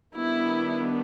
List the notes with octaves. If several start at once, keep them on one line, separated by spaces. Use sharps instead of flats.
D#3 G3 B3 D4 E4